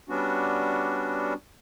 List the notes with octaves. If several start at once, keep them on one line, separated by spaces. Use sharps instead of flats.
G3 B3 C#4 D4 F#4